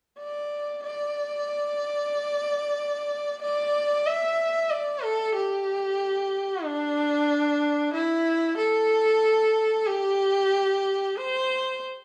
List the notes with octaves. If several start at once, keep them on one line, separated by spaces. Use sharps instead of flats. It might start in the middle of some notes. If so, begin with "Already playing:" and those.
D5
D5
D5
E5
D5
A4
G4
D4
E4
A4
G4
C5